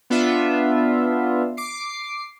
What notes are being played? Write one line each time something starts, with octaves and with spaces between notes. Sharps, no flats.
B3 D4 F4 E5
D6 C7